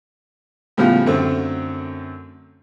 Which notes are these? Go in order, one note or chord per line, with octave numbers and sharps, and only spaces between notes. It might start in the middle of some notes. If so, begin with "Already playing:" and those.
A2 C#3 F3 G3 B3 F4
F#2 D3 A3 C4